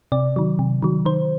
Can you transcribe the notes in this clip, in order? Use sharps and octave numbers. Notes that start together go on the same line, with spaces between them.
C3 D5
D#3 F#3
C3
D#3 F#3
D#3 C5